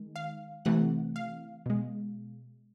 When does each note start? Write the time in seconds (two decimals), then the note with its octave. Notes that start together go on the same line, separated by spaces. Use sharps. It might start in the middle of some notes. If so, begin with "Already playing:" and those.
Already playing: D#3 G#3
0.16 F5
0.65 C3 E3 A3 F#5
1.16 F5
1.66 B2 G#3